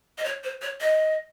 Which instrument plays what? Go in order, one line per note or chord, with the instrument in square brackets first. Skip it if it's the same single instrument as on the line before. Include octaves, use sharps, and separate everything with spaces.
[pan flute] D#5
C#5
C5
C#5
D#5